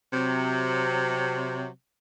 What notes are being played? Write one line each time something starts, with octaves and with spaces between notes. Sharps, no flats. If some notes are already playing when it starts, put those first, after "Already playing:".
C3 F#3